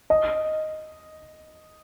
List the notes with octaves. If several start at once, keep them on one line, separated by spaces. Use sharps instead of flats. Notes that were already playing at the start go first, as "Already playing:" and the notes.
D#5